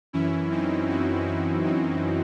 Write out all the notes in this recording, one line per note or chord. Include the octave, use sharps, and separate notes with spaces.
F#2 E3 C#4 E4
C4 D#4
D#4 F#4
C#4 E4
C4 D#4